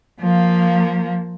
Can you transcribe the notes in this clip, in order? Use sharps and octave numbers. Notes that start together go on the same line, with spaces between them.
F3 A#3